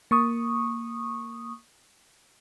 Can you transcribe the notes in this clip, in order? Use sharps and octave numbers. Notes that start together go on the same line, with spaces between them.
A#3 C#6 D#6